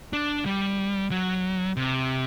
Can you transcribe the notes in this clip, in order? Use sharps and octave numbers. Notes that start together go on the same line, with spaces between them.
D4
G3
F#3
C3